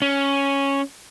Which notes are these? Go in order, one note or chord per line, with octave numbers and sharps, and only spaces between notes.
C#4